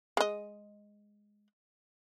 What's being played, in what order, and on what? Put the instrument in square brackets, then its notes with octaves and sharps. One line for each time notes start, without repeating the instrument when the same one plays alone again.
[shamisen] G#3 D#5